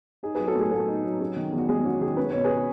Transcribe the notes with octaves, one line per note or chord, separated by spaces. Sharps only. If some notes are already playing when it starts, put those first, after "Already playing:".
D#4 G#4
F#3 G#4 B4
F#4 A4
A2 G#4
A3 F#4 A4
D#4
F#3
C#4 G#4
D#3
E2
F#4
G#3 G#4
C#4 F#4
D#3 G#4
C#4 B4
B2 C#5
G#4 B4